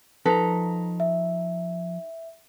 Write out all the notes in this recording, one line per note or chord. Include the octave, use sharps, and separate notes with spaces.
F3 D#4 A4 B4 A#5
E5